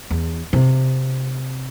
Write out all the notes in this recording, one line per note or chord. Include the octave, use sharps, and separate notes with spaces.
E2
C3